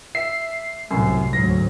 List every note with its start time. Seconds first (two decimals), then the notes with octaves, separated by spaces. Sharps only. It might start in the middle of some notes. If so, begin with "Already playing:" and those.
0.15 E5 C7
0.91 C2 F#2 A2
1.33 D2 G#2 F#3 A#6